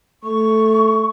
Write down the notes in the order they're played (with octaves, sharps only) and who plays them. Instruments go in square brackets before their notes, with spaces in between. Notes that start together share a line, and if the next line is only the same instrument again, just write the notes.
[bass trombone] A3 [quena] C#6